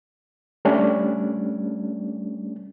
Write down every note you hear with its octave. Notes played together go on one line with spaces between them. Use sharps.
G3 A3 C#4 D4